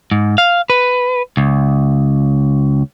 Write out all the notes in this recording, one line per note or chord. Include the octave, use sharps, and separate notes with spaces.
G#2
F5
B4
C#2